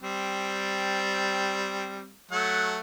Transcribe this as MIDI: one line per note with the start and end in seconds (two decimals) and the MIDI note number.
0.03 2.11 55
0.03 2.11 60
2.31 2.79 54
2.31 2.79 57
2.31 2.79 78